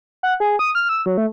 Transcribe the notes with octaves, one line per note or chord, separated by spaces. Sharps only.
F#5
G#4
D#6
F6
E6
F#3
A3